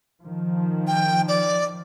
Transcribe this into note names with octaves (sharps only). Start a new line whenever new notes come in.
D#3 F3
G5
D5